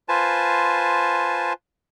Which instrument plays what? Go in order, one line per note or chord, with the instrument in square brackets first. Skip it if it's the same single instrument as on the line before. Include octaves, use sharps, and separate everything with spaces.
[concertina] F4 B4 C5 G#5 A5